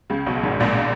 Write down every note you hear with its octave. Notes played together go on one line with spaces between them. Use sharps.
C#2 C#3
B1 B2
G#1 G#2
A#1 A#2